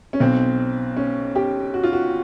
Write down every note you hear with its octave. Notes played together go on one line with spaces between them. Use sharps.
C#4
B1 B2 C4
C#4
G4
F#4
F4
F#4